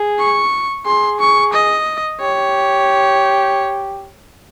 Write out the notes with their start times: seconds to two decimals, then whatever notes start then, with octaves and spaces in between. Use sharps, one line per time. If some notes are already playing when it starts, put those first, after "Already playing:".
Already playing: G#4
0.19 C#6
0.86 G#4 C6
1.20 C#6
1.54 D#5
2.21 G4 C#5